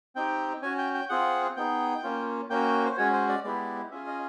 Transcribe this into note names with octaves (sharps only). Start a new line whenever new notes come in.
C4 D#4 G4 G5
C#4 F#4 G#5
G5
G5
C4 F4 G#4 F#5
B3 D#4 G#4 G5
A#3 C#4 F4
A#3 C#4 F#4 G5
C5
G#3 C#4 F#4 C#5
C5
D5
G#3 B3 E4 G4 D5
C#4 F4 G#4 E5
D#5